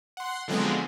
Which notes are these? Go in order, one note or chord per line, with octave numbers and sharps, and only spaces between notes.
F#5 C6
D3 F3 F#3 G#3 B3 C4